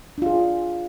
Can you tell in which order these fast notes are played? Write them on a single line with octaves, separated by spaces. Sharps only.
D4 F4 G#4